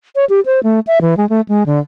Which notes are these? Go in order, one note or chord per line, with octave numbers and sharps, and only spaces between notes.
C#5
G4
C5
A3
E5
E3
G#3
A3
G#3
D3